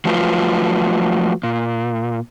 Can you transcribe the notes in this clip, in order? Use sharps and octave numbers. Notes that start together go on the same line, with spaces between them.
F3 F#3 A3 F4 B4
A#2